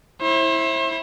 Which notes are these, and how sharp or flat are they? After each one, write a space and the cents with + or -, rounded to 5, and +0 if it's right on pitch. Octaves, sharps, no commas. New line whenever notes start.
E4 -5 C5 +35